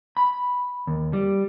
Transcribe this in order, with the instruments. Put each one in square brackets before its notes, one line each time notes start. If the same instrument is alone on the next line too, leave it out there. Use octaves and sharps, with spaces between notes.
[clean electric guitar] B5
D#2
G3